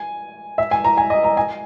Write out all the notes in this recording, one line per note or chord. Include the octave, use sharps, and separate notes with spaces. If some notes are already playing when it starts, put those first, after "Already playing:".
Already playing: G#5
E5
G#5
A#5
G#5
D#5
A#5
G#5